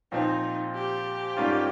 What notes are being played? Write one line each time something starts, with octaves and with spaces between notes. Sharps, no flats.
A#2 F3 C4 D#4
G4
G#2 G3 A#3 C#4 F4